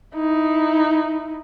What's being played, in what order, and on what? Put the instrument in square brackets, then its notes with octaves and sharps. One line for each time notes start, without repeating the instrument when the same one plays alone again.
[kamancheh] D#4 E4